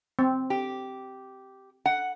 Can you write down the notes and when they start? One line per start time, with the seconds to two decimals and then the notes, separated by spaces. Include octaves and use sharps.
0.19 C4
0.50 G4
1.86 F#5